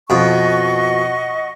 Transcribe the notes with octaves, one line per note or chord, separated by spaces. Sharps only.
F2 B2 D#5 F#5 C#6